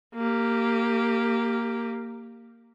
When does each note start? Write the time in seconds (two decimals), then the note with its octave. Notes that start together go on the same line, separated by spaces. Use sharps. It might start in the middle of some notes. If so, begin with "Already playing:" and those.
0.15 A#3 G4